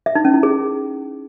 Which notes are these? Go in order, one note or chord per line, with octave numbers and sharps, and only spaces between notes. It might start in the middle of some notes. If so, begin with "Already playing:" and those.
E5
D#4
C#4
E4
G#4